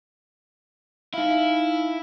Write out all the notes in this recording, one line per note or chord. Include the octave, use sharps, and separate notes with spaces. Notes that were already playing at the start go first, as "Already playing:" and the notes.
D#4 E4 F5